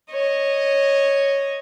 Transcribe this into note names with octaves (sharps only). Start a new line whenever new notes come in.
C#5 D#5